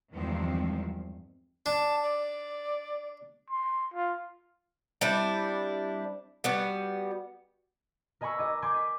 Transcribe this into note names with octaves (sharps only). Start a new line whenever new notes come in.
E2 G2 D#3 F3 G#3 C4
D4 A5
D5
C6
F4
G3 C4 D4 E4
G3 B3 F#4
A#4 D#5 G#5 B5 C#6 E6
D#5 G#5 D6
G#5 C6 D6 G6 G#6
B6 D#7